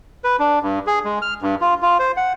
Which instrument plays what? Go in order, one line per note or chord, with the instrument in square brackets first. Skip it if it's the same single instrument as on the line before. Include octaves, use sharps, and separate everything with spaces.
[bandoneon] B4
D4
G2
G#4
G#3
F6
G2
F4
F4
C5
F#5